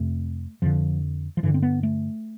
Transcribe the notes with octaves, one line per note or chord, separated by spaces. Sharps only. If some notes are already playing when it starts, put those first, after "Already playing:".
Already playing: F2 C3 A3
F2 D3 F3
F3
G2 D3 E3
C4
B3
A3